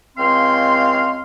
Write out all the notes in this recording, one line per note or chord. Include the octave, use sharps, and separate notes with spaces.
C#2 C4 F5 C6